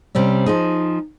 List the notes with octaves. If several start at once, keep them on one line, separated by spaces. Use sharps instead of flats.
C3 G3 C4 C#4
F3 D#4 G#4